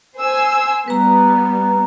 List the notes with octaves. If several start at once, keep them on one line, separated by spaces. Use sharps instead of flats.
C5 G#5 E6
G3 B3 B4 A#5